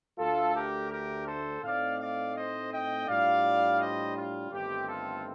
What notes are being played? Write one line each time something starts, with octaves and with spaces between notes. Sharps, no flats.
D2 D3 A3 F4 A4
G4 A#4
G4 A#4
A4 C5
A2 A3 C4 D#4 D5 F5
D5 F5
C5 D#5
D#5 G5
A2 G3 D4 F4 D5 F5
C5 D#5
F4
G1 G2 D#3 A3 C4 G4
F4 A4